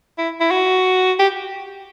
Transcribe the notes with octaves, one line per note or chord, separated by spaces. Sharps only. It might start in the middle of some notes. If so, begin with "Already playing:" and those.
E4
E4
F#4
G4